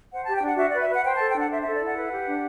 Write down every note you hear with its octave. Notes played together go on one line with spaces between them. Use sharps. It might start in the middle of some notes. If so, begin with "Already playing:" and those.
C5 F#5
G4 A5
G5
D4 F#5
F#4 E5
B4 D5
E5
B4 F#5
C5 G5
A4 A5
G5
D4 F#5
C5 E5
A4 E5
D5
E4 F#5
B4
G4
D4